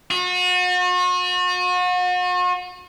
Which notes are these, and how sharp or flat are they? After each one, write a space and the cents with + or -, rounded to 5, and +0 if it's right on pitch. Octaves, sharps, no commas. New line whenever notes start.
F#4 -40